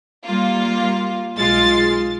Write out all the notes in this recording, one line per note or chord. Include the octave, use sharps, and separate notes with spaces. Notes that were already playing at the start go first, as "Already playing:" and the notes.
G3 A#3 F4
B1 G#3 F4 A6 C7